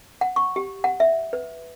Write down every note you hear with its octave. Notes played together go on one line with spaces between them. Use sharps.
F#5
C#6
G4
F#5
E5
B4